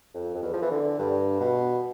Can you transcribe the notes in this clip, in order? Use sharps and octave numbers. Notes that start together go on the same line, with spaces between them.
F2
F2
E2
F3
E3
D3
G2
B2